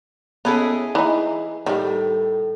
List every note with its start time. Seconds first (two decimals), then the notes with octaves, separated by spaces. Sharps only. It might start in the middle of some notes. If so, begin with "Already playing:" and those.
0.45 B3 C#4 E4 G#4 A4 D#5
0.95 E3 D#4
1.66 A2 D#3 G3